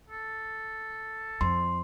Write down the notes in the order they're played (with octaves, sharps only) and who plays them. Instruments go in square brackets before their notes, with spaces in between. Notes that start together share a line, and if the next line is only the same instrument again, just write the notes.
[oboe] A4
[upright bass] F2 [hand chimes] C6